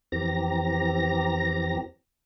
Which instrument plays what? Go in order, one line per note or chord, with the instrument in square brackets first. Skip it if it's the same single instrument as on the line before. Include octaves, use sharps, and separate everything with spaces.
[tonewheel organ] F2 E3 C4 G4 A#5 A#6